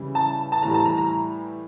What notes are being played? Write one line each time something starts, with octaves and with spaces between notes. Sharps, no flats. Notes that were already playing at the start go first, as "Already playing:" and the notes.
Already playing: C#3 E3 G3
A5
A5
A2 E3 G3 A#5
A5
A#5
A#5